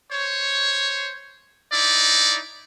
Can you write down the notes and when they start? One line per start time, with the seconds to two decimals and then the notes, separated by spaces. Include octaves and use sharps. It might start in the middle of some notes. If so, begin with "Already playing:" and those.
0.11 C5 C#5
1.72 D#4 E4 D5